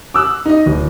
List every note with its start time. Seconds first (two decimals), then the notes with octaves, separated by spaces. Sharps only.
0.14 D6 E6 F#6
0.45 D#4 D#5
0.66 D1